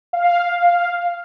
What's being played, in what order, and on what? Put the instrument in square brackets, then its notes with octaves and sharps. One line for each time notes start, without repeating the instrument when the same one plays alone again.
[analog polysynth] F5